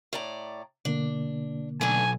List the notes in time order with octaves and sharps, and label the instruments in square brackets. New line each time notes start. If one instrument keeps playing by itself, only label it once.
[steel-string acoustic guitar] A2 D5 A#5
[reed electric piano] B2 D3 A#3 [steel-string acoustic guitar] D4
[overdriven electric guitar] B1 [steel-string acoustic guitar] A3 B3 D4 [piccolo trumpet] G#5